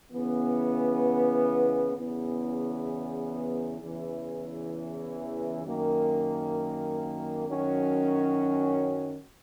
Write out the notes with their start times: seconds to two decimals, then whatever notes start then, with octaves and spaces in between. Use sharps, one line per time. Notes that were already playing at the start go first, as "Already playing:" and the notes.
0.12 C#3 E3 B3
1.96 E2 C#3 E3 B3
3.80 E2 C#3 E3
5.64 F#2 D#3 A#3
7.48 F#2 D#3 F#3 C#4